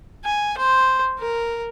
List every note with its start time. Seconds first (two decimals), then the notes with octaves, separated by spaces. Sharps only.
0.25 G#5
0.57 C5
1.19 A#4